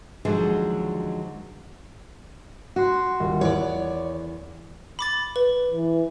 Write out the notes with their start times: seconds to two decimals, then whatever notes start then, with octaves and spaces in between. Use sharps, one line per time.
0.25 D#2 D3 F3 F#3 G#3
2.76 F#4 F#5 C6 C7
3.20 D#1
3.41 E2 C#5 D5
4.99 B5 D6 A6
5.36 B4
5.71 E3